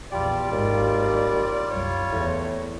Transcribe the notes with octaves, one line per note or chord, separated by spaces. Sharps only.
A#1 E2 G3 F4 G4 D5
G#1 D#2 G#2
C2 F#2 C#5
E2 A2